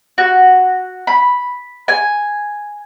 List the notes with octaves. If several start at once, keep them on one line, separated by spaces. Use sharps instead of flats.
F#4
B5
G#5